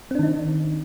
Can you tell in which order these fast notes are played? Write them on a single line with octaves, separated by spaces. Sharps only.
C4 D4 D#3 D#4